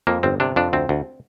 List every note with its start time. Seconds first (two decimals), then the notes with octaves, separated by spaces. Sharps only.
0.07 F2 A#3
0.23 G1 C4
0.40 C3 D4
0.56 F2 D4
0.73 D2 C4
0.89 D2